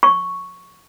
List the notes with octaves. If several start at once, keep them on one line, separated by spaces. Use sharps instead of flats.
C#6